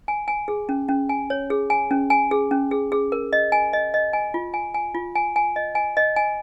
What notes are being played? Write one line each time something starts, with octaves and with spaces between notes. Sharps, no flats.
G#5
G#5
G#4
C#4
C#4
G#5
C#5
G#4
G#5
C#4
G#5
G#4
C#4
G#4
G#4
A#4
D#5
G#5
D#5
D#5
G#5
F4
G#5
G#5
F4
G#5
G#5
D#5
G#5
D#5
G#5